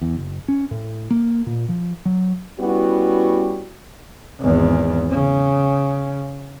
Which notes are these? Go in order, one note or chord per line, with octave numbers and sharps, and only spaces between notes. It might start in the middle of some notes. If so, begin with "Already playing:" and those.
E2
F#1
C#4
A2
A#3
A#2
F3
F#3
G3 B3 C#4 E4 F#4
G#1 E2
C#3